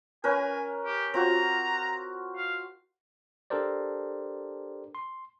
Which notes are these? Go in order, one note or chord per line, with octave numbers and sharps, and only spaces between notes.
C#4 A#4 B4 G#5
G4
C4 F4 F#4 A#5
F5
D4 G4 A4 A#4 C5 D5
C6